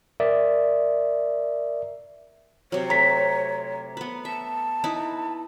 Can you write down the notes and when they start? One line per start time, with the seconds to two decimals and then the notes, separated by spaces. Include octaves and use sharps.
0.20 A#4 D5 E5
2.72 C3 F#3 C#5
2.90 A3 A#5 B6
3.97 B3 B4
4.25 E5 A5
4.84 D#4 E4 B4